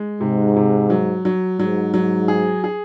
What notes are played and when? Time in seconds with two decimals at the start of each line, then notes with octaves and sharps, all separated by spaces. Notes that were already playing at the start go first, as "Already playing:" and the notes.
Already playing: G#3
0.21 G#2 C3
0.56 C3
0.90 F#3
1.25 F#3
1.59 G#2 F#3
1.94 F#3
2.28 G#4
2.64 G#4